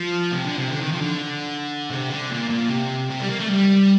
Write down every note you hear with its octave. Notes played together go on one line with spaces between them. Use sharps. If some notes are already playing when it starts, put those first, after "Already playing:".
Already playing: F3
C3
D3
C3
D3
D#3
F3
D3
C3
D3
A#2
A#2
C3
C3
G3
A#3
A3
G3